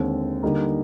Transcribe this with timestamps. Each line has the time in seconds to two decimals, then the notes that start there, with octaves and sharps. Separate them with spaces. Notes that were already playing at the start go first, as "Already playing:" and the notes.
Already playing: D#2 D3 G#3 C4
0.43 D3 G3 A#3 D#4